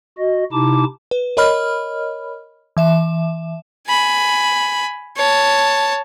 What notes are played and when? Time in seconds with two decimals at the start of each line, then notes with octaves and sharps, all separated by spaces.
0.18 F#4 D#5
0.52 C3 D#4 E4 A5 D6
1.11 B4
1.37 A#4 C#5 D#5 B5 F6
2.77 E3 E5 E7
3.87 G#5 B5
5.16 C#5 A5